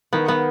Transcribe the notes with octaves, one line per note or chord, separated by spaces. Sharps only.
D#3 B3
B3